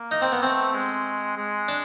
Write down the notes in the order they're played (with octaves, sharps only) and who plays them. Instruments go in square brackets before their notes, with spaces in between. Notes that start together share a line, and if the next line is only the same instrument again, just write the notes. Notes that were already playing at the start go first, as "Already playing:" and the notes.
Already playing: [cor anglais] A#3
[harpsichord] D#4
C4
B3
[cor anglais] A3 [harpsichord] C4
[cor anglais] G#3
G#3
[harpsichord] D4